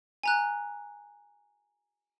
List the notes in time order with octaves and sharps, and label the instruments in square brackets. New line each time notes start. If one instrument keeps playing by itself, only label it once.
[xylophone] G#5 A#5 F#6